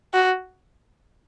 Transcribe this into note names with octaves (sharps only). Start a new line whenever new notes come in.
F#4